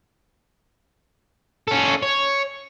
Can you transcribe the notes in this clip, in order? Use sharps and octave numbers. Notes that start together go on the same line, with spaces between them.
C#4 A4
C#5